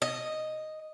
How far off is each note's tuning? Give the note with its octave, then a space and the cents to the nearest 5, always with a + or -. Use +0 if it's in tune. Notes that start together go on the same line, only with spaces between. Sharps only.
D#5 -5